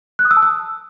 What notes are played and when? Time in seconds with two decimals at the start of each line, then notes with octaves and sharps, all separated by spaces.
0.19 F#6
0.25 D#6
0.31 E6
0.37 A5
0.43 E6